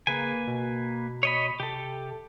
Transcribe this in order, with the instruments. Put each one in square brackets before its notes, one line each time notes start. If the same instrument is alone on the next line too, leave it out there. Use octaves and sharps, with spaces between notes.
[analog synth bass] C#3 [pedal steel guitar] A#3 B4 G#5
[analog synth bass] B2
[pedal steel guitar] C#5 D#5 B5
[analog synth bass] C3 [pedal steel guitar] G4 A4